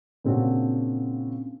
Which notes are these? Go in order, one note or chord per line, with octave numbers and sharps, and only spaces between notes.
A#2 C#3 C4 D4 F#4